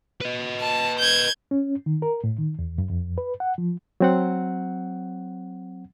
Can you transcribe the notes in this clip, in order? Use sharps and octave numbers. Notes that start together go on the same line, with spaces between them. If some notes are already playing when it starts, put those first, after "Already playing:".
B4 D#5
A5
G6 G#6
C#4
D#3
A#4
A2
D#3
E2
F#2
F2
B4
F#5
F3
F#3 C4 F#5